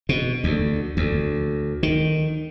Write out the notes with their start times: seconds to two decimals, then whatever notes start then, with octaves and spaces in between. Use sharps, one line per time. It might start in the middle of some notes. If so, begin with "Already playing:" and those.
0.09 B2
0.44 D2
0.97 D2
1.83 D#3